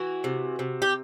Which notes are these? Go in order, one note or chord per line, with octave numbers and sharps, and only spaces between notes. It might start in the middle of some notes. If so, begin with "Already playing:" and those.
Already playing: E3 F#4
C3
C3
G4